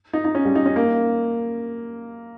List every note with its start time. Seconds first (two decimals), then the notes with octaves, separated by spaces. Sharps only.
0.13 D#4
0.25 D#4
0.35 C#4
0.45 G3
0.55 D#4
0.66 C#4
0.76 A#3